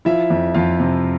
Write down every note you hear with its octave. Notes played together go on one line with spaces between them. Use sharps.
F3 E4 E5
F2
F2 F4 F5
C3